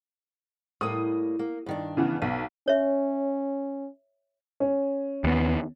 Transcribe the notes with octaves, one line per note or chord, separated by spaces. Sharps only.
A2 G3 A#3 D#6
A#3
G2 D#3 D4
C#3 E3 B3
B1 B3
C#4 C#5 E5
C#4
D#2 B3